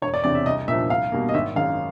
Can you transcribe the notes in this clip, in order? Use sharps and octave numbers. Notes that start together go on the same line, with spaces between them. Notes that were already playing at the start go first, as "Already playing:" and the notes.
E1 C#5
D5
E2 C3 D5
E5
C2 D#5
A#2 F3 E5
C2 F5
B2 G3 A#3
D#5
G#1 E5
F#2 D#3 G#3 F5